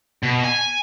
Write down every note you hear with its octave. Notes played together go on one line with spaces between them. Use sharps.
B2
G#5